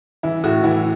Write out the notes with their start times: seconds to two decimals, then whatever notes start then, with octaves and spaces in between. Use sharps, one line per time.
0.23 E3 E4
0.44 A2 F#4
0.64 E3 E4